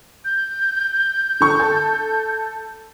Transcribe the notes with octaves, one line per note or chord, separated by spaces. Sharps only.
G6
D3 C#6
A4